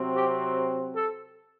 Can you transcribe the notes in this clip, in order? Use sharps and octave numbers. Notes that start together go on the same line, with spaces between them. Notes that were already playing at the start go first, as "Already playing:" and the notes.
Already playing: C3 F#3 C4
G4
A4